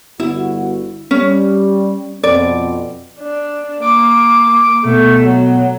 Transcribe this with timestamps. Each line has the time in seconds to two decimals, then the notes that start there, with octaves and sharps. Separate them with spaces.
0.20 G1 G2 E4 F#4
1.11 G3 C#4
2.23 F2 B2 C4 D5
3.19 D4
3.81 A#3 D6
4.85 B2 A3
5.27 F#3